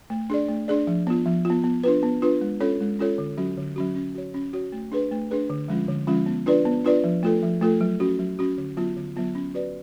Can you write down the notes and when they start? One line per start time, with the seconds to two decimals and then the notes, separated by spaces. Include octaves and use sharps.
0.10 A3
0.30 D4 G#4 D5
0.48 A3
0.68 D4 G#4 D5
0.87 F3
1.07 B3 F4
1.26 F3
1.45 F4
1.50 B3
1.64 B3
1.84 D4 F4 B4
2.03 B3
2.22 D4 F4 B4
2.41 G#3
2.60 C#4 F4 A4 C#5
2.80 G#3
2.99 C#4 F4 A4 C#5
3.18 D3
3.37 F#3 C#4 F#4
3.57 D3
3.76 F#3 C#4 F#4
3.95 C#4
4.15 F#4 C#5
4.34 C#4
4.53 F#4 C#5
4.72 A3
4.92 D4 G#4 B4
5.11 A3
5.31 D4 G#4 B4
5.50 D3
5.68 F3 G#3 C#4 F4
5.88 D3
6.07 F3 G#3 C#4 F4
6.26 B3
6.46 D4 F4 B4 D5
6.65 B3
6.84 D4 F4 B4 D5
7.04 F3
7.23 A3 F4 A4
7.43 F3
7.61 A3 F4 A4
7.81 F#3
8.00 C#4 F#4
8.19 F#3
8.39 C#4 F#4
8.58 D3
8.77 F#3 B3 F4
8.96 D3
9.16 F#3 B3 F4
9.35 C#4
9.54 F#4 B4 D5